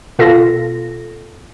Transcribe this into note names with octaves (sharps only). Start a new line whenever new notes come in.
B2 F4 A4 A#6